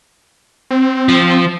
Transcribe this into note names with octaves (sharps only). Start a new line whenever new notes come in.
C4
F3